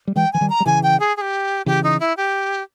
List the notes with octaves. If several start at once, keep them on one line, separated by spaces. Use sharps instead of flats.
G3
E3 G#3 G5
E3 G#5
D#3 G3
A#5
G3
C#3 E3 G#5
G5
G#4
G#4
G4
C#3 E3 G4
D#4
E4
G4